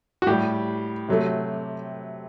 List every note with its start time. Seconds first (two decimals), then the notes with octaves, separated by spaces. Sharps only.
0.22 F#4
0.27 A2 G3 G4
1.08 C3 F#3 A3